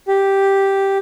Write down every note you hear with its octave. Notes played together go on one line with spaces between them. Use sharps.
G4